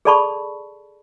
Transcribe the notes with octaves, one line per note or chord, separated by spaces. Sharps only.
G#4 A4 D5 A5 B5 C#6